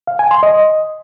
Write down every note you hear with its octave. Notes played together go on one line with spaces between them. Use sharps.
F5
G#5
C6
D#5